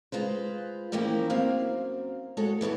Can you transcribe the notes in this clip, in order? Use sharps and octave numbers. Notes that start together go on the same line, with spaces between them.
G#3 F4 B4 C5
E3 F3 A#3 C#4 E4 G4
F#2 A#3 C4 F5
G#3 F#4 A4 C#5
E3 B3 E4 C#5